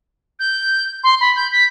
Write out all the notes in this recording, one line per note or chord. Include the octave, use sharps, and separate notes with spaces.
G6
C6
B5
G6
B6